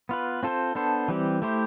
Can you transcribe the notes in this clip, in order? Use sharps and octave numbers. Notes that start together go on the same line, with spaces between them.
B3 F4 B4
C4 F4 A4 C5
B3 D4 A4 C5
E3 G3 C4 G4
A3 E4 G4 C5